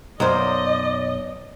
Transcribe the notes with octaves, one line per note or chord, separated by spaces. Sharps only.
B1 F#2 F#3 A#3 C5 D5 D#5